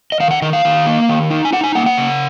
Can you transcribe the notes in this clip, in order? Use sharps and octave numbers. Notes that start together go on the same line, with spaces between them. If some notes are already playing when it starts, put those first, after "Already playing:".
D#5
D#3 F5
F#5
D#3 D#5
F5
D#3
A#3
D#3
D#4
G#5
D#4 F#5
G#5
A#3 F#5
F#5
C#3